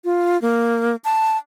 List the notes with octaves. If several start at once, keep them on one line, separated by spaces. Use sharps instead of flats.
F4
A#3
A5